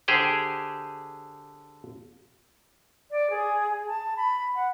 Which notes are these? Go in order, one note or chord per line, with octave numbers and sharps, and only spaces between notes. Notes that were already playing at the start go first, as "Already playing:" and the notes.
D3 G4 G#4 C5 G5
D5
G#4
A5
B5
F#5